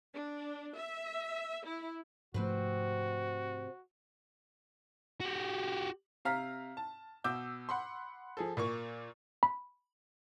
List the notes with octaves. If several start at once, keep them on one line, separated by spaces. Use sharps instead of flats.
D4
E5
E4
G#2 C3 F3 A3 C4 F#4 B4
F#4 G4
C3 F5 A#5 F6 B6
A5
B2 D6 E6 G6
F#5 B5 C6
F3 G#4 A4
A#2 A#3 C#6
B5